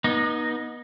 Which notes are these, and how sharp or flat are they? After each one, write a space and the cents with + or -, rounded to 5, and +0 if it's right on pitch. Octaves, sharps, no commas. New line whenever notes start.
B3 -35 D#4 -5